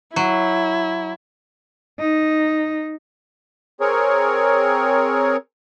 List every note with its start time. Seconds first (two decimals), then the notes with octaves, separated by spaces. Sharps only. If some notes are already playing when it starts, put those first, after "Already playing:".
0.16 F#3 E4
1.99 D#4
3.81 C4 G#4 A#4 C#5